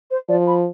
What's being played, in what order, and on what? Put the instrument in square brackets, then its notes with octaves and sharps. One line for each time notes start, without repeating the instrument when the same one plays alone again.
[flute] C5
[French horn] F3 [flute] D5
[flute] B5